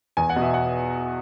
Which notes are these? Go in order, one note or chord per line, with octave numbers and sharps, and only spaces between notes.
E2 G#5
F#5
B2
E5
F#5